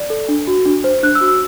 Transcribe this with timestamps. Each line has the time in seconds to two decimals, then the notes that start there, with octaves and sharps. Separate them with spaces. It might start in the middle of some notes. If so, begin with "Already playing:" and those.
Already playing: D5
0.10 A4
0.29 D4
0.47 F#4
0.66 D4
0.84 C5
1.03 D4 F#6
1.15 E6
1.21 F#4
1.28 E6